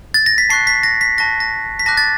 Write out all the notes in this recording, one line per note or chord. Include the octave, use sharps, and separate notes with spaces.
A6
A#6
B6
A5 C#6 F#6 C7
B6
A#6
B6
A5 C#6 F#6 A#6
A#6
B6
A5 D6 F#6 A#6
A6